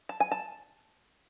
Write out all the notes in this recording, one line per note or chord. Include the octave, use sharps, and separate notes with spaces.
A5
G#5
A5